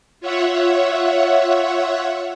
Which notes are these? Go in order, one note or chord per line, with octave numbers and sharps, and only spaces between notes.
F4 C#5 E5 F#5